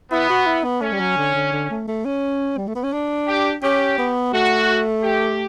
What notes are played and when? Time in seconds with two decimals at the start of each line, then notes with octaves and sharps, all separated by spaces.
0.12 B3 E4
0.29 F#4
0.46 E4
0.64 B3
0.82 A3 C#4
0.92 G3
1.00 F#3
1.17 D3
1.35 D3
1.52 D3
1.70 A3
1.88 A3
2.05 C#4
2.58 G3
2.67 A3
2.75 B3
2.84 C#4
2.93 D4
3.28 G4
3.63 C#4 G4
3.98 B3
4.33 A3 F#4
5.04 G4